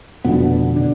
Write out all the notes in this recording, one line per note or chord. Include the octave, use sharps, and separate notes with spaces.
F1 F2 B2 D3 B3
D3